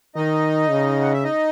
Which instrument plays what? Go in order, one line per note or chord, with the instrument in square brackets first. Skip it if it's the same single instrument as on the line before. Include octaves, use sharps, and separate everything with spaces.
[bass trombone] D#3 [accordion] D#4 D#5
[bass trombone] C#3
[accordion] F#5
E5
D#4 D#5